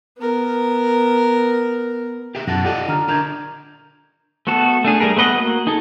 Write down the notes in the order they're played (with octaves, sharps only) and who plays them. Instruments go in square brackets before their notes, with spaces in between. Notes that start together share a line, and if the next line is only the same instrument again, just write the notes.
[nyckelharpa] B3 A#4
[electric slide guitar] G4 G#4 E5
[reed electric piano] F#2 [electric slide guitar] B2 F#5 A5 [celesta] E4 A#6
[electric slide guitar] F4 D5 D#5 [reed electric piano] G4 A4 F#5
[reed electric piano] D3 [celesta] A#5 F6
[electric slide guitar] D4 A#4 [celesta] A#5 G6 G#6
[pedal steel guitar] A3 B3 F#4 A4
A3 D4 G#4
G3 A3 G#4 A#4
A3 B3 B4 D#5 F#5
A#3 F#4
D#4 G#4 A4